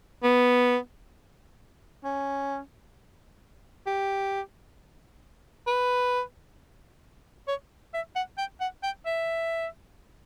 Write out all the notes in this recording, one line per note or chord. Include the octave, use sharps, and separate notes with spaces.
B3
C#4
G4
B4
C#5
E5
F#5
G5
F#5
G5
E5